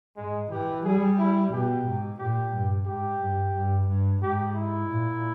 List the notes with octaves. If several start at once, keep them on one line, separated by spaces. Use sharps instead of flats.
G#2 G#3
E3 G4
G3 G#4
E4
B2 G4
G#2
A#2 G4
G2
G#2 G4
G2
G2
G2
G#2 G4
E4
A#2